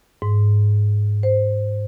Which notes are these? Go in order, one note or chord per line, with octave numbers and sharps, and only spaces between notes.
G#2
C5